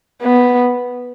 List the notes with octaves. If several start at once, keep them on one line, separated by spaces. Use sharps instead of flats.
B3